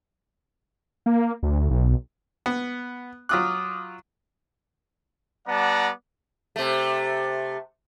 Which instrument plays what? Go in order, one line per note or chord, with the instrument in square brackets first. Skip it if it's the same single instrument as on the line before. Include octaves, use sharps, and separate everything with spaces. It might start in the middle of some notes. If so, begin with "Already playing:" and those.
[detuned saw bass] A#3
D2
B1
[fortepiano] B3
[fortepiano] F#3 F4 F#6 [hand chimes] D6 D#6 F6
[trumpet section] G3 B3 D5 F#5 A5 A#5
[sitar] C3 A3